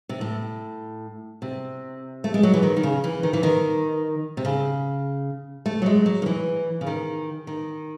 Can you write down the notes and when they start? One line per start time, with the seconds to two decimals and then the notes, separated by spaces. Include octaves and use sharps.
0.09 C3
0.21 A2
1.42 C3
2.24 A3
2.34 G#3
2.43 F#3
2.54 E3
2.63 D#3
2.76 D#3
2.83 C#3
3.04 E3
3.23 D#3
3.33 E3
3.43 D#3
4.37 C3
4.45 C#3
5.66 A3
5.82 F#3
5.86 G#3
6.06 F#3
6.22 D#3
6.26 E3
6.81 C#3
6.87 D#3
7.47 D#3